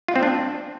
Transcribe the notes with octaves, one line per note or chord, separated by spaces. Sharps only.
F4
C4
D4